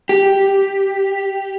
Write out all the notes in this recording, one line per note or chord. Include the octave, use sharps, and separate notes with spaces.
G4